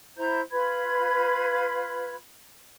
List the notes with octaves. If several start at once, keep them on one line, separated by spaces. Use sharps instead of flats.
E4 C5 A#5 G6
F4 B4 B5 G#6